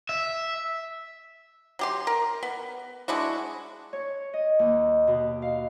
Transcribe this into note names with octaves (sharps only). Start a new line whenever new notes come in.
E5
F#3 G4 C6
A#4
B3
G#3 D4 E4 F#4
C#5
D#5
D#2
B2
F5